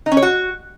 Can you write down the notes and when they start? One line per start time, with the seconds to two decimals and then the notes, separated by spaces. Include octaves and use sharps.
0.06 D#4
0.12 C#4
0.17 C#5
0.22 F#4